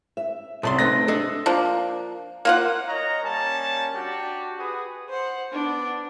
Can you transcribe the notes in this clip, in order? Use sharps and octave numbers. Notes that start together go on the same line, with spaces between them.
E5
C2 A2 C#4 D5 C6
B1 A3 C4 D#4 B4 A#6
D4 G#4 A4 D#5
F3 A#3 D4
A#3 F4 F#5
A#4 C#5 D#5 A#5
G3 A#3 C#4 A5
D4 F#4 G4
F#4 G#4 B4 D#6
C5 F#5
B3 D4